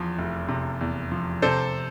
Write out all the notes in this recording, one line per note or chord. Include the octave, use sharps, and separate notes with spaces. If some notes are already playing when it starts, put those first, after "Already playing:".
Already playing: E2 F3
F1
C3
E2
F3
C3 A4 C5